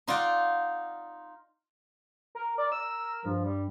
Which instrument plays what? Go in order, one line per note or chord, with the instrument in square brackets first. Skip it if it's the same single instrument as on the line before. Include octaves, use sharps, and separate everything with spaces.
[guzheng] D#4 F4 D5 F#5
[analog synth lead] A#4
[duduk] A#4 [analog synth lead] D5
[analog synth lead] E6
[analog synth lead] G2 [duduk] F3
[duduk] G3